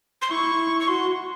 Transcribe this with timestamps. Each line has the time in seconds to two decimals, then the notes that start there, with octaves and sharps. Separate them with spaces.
0.22 C6
0.30 E4 C#6
0.80 C#6
0.88 F#4 C6